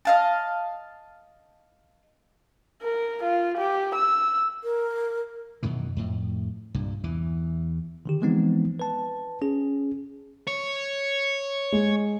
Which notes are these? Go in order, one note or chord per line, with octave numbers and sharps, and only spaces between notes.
D#5 F5 A5
A#4
F4
G4
E6
A#4
F#2 B2 D#3 E3
F2 A2
C2 G2 A#2
E2 E3
D3 D#3 G4
E3 F3 G#3 B3 C4 D#4
B4 A5
C#4 G#4
C#5
G#3